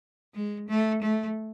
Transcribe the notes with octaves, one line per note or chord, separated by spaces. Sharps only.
G#3
A3
A3